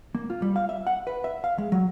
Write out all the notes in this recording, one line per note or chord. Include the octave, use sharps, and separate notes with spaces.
A#3
F4
G3
F5
E5
F#5
B4
E5
F5
G#3
F#3